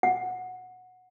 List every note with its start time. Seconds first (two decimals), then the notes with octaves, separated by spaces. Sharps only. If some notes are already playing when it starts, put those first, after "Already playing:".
0.03 F#5